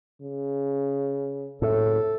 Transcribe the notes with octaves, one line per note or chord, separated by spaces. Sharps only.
C#3
F#1 A2 A4